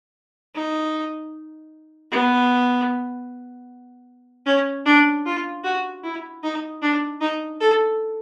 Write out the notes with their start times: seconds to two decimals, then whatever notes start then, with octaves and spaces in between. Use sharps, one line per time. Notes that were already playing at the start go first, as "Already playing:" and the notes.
0.54 D#4
2.11 B3
4.46 C#4
4.85 D4
5.25 F4
5.64 F#4
6.03 E4
6.43 D#4
6.82 D4
7.21 D#4
7.60 A4